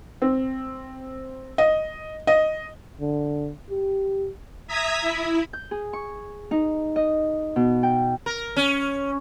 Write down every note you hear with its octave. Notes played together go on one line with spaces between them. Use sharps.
C4
D#5
D#5
D3
G4
E5 A#5 D#6 G#6 B6
E4
G6
G#4
C#6
D#4
D#5
B2
G5
A#4
C#4